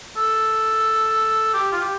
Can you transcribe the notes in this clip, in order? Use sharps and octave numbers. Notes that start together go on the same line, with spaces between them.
A4
G4
F4
G4